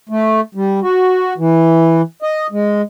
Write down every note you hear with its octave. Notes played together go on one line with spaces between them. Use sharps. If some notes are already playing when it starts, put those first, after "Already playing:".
A3
G3
F#4
E3
D#5
G#3